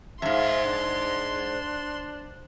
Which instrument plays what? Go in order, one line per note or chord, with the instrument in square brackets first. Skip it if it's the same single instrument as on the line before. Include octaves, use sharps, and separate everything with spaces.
[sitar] F2 G#2 [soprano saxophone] E5 [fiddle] C6
[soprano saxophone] D4